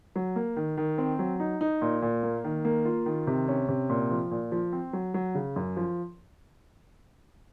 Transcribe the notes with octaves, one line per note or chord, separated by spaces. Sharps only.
F#3
A#3
D#3
D#3
C4
F#3
D#4
D#4
A#2
A#2
A#3
D#3
A#3
F4
D#3
C3
C#4
C3
A#2
F3
A#2
F3
C4
F#3
F#3
C#3
F#2
F3